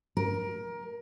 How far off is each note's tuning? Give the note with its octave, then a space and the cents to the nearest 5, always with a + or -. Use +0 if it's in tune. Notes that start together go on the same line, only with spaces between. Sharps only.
A#4 +20